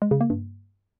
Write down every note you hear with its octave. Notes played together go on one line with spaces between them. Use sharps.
G#3
C#3
A#3
G2